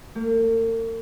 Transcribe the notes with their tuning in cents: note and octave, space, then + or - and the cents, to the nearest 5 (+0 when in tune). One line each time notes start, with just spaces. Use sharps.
A#3 -45 F5 +0